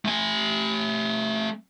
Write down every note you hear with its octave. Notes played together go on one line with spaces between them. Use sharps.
A3 G#5